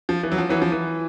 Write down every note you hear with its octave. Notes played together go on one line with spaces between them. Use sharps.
F3
E3
F#3
F3
E3 F#3
F3
E3